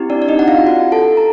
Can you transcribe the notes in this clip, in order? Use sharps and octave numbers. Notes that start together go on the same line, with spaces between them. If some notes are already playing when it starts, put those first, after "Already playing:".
Already playing: C4 E4 G4
D4 D5
D5
D#4 D#5
F#5
F4 F5
F#4 F#5
A4 A5
A#5